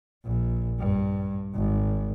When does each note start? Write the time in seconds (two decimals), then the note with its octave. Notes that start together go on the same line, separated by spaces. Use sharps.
0.25 A#1
0.79 G2
1.55 G#1